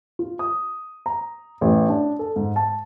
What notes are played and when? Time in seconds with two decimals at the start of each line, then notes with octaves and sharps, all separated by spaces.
0.19 F4
0.39 D#6
1.06 A#5
1.61 A1
1.89 D4
2.19 A4
2.36 G#2
2.56 A5